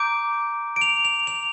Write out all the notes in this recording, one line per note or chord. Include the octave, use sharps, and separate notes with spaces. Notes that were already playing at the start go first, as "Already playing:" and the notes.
Already playing: A#5 D6 G6 D7
D7
F7
F7
F7